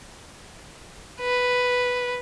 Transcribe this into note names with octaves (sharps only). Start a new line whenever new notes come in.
B4